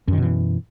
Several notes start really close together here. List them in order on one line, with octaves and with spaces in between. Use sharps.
F#2 D#3 B2 E3